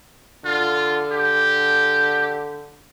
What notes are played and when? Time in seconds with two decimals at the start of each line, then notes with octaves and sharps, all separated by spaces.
0.45 D3 F4
1.12 G4